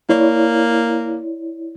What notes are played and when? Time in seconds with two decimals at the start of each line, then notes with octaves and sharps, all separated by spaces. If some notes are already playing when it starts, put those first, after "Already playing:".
0.09 A#3 E4 C#5 D5